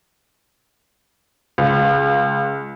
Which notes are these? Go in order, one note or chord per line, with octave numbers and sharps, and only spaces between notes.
C#2